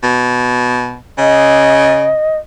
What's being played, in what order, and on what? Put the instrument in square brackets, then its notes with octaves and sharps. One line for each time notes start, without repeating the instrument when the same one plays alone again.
[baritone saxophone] B2
[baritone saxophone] C#3 [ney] D#5